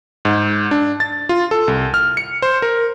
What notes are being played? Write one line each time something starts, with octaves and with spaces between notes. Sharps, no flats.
G#2
D4
A6
F4
A4
C2
F6
C#7
C5
A#4